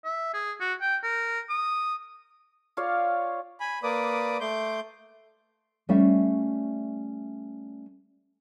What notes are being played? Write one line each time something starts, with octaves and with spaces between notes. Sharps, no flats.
E5
G#4
F#4
G5
A#4
D#6
F4 C#5 D5 F5
G#5 B5
A#3 B4 D5 D6 D#6
A3 C6 D6 G6
G3 A3 C#4 E5 F5